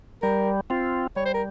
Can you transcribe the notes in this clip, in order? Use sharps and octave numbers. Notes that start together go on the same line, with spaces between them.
G3 A#4
C4 F4
G3 C#5
C5
A#4